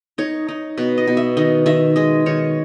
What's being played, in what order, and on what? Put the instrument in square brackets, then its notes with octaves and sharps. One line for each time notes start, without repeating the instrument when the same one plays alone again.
[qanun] D#4 C#5
D#4
B2 B4
D#5
B2
E5
D#3 D#5
D#3 E5
G#3 D#5
D#3 C#5